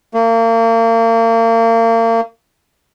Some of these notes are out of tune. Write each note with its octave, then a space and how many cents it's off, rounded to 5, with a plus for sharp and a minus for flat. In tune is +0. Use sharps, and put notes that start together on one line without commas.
A#3 -35